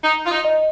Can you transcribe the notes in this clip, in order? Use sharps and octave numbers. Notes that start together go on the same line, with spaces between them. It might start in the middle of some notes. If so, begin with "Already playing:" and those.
D#4 A#5
F4
D#4
D#5